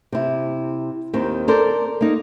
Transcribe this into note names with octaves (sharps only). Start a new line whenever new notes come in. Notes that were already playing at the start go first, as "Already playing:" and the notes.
C3 E4
D#2 D#3 C4
A4 A#4 C5 D5
A#3 D#4